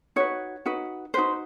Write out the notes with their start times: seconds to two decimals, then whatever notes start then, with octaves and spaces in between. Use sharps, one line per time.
0.16 D#4 F#4 B4 C#5
0.66 D#4 F#4 B4
1.14 D#4 F#4 B4 C5